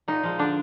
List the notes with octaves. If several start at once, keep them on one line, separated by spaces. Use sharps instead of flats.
A#2 D#4
F3 G#3
D3 D4